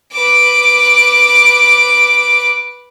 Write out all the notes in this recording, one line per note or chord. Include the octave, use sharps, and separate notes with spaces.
B4 D6